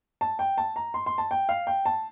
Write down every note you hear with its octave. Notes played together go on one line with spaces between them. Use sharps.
A5
G5
A5
A#5
C6
C6
A5
G5
F5
G5
A5